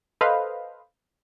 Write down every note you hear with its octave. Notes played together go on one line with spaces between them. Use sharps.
A4 B4 C5 D#5 F5